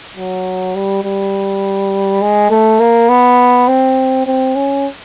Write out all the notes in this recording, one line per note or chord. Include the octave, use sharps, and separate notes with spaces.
F#3
G3
G3
G#3
A3
A#3
B3
C4
C4
C#4